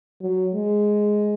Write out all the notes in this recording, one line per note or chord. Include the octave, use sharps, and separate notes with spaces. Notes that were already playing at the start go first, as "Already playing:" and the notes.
F#3
G#3